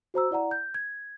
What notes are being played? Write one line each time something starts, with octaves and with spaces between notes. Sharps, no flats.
F#4 C5 A#5 E6
E4 D5 F#5 A#5
G6
G#6